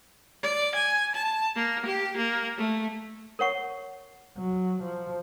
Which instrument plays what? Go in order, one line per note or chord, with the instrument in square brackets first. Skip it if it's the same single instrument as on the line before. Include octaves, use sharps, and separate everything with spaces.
[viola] D5
G#5
A5
A#3
G4
A#3
A3
[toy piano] A#4 C#5 F#5 C#6
[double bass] F#3
F3